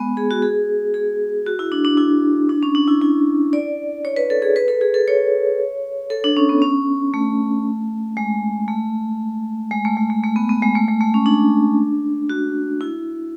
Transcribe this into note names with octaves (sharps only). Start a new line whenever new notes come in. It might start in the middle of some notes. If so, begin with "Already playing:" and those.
Already playing: G#3 B3
G#4
F#4
G#4
G#4
F#4
E4
D4
D4
E4
D4
C#4
D4
E4
E4
D5
C#5
B4
A4
G#4
B4
A4
G#4
A4
C#5
A4
D4
C#4
B3
C#4
A3
G#3
A3
G#3
A3
G#3
A3
A3
B3
B3
G#3
A3
G#3
A3
C#4
D4
F#4
E4